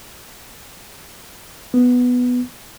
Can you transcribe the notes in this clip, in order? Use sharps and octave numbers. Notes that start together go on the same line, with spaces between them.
B3